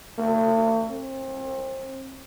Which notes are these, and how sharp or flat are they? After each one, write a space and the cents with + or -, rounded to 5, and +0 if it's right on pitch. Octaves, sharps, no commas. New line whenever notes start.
A3 +40
C4 +30